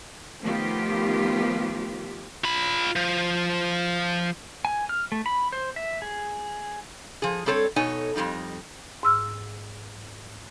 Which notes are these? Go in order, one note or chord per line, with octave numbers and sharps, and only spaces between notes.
D#3 F3 A3 B3 F4 G4
F4 B5
F3
G#5
F6
A3
B5
C5
E5
G#4
F3 G#4
G3 C4 A4 C5 C#5
B2 D#4 A4 C#5 G#5
F2 F3 G3 D#4
G#2 E6 F6